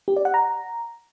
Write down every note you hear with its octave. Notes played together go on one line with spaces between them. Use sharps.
G4
D5
F#5
A#5